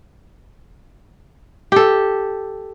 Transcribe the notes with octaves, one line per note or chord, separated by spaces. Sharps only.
G4 A4